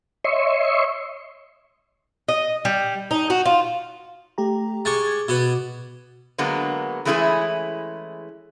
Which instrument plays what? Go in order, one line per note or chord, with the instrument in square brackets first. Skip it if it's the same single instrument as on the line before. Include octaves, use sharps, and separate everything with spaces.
[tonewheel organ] C#5 D#5 E5 C6 C#6
[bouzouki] D#5
G3
D#4
F#4
F4
[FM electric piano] A3 G4 A#5
[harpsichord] G#3 C#6 [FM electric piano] D6 G#6 A6
[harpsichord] B2 B3
[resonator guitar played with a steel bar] D3 F#3 G#3 A#3 B3
E3 G#3 A3 C#4 E4 G#4